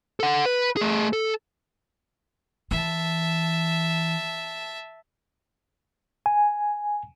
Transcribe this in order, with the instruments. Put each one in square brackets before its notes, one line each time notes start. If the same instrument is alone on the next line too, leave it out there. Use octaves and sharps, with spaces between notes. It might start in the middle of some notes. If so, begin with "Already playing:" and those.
[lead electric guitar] A4 F#5
B4
A3 G#4
A4
[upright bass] E3 [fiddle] E5 A5
[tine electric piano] G#5